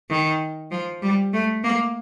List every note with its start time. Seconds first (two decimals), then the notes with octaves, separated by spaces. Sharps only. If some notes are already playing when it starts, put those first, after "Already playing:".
0.10 D#3
0.71 F3
1.02 G3
1.33 A3
1.64 A#3